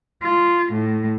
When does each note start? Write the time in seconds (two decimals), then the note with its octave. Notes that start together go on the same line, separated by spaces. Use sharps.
0.23 F4
0.72 A2